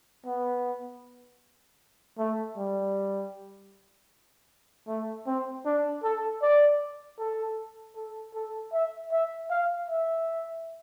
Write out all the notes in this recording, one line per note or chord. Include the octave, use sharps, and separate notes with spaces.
B3
A3
G3
A3
C4
D4
A4
D5
A4
A4
A4
E5
E5
F5
E5